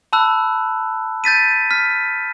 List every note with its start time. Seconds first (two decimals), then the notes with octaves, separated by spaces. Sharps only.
0.13 A5 B5 E6 F#6
1.24 G6 A6 B6 D#7
1.71 F6 A6 B6